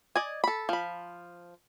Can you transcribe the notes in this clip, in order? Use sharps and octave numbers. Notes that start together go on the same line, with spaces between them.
D5 D#5 G#5
A4 B5
F3 B5